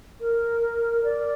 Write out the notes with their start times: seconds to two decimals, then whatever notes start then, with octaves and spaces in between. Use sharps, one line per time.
0.21 A#4
1.04 D5